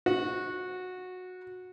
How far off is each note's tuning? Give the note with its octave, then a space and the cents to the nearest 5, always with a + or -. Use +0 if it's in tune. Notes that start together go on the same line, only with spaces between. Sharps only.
F#4 -15